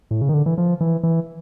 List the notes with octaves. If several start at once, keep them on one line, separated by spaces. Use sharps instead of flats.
A2
C#3
D#3
D3
E3
F3
E3
E3